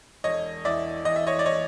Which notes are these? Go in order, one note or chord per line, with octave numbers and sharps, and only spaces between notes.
E1 C#5 D#5
E2 D5 E5
E2 D#5
E5
C#5 D#5
D5
C#5 D#5